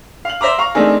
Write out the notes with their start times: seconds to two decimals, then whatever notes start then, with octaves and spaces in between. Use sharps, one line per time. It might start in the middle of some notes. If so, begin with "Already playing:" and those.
0.25 F5 F#7
0.41 C5 E5 A#5 D6
0.58 F5 A#5 C#6
0.75 A3 C4 D4 D#4 G#4 A#4